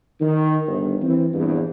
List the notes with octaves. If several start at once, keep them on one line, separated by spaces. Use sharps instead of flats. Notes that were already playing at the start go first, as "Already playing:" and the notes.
D#3
G1
E3 C4
A#1 E2 G2